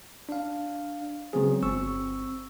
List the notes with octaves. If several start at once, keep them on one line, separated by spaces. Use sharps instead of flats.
D4 F5
C#3 F#3 G#3 B3 C4 G#4
G1 C4 C#6 E6